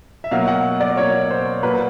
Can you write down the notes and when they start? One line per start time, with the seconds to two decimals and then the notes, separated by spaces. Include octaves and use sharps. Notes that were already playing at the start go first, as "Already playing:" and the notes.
0.24 E5
0.31 B2 F#3 A#3 F5
0.48 F#5
0.81 D5
0.97 B2 F#3 A#3 C#5
1.31 C5
1.63 A#2 F#3 A#3 B4